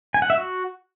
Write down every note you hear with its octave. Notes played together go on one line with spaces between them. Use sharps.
G#5
F#5
E5
F#4